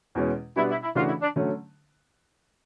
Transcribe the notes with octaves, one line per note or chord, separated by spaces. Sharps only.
E2 B2 G#3 C#4
B2 G3 B3 D4 E4
E4
E4
C#3 E3 A3 D4 F4 F#4
E4
D4
D3 F#3 A3 C#4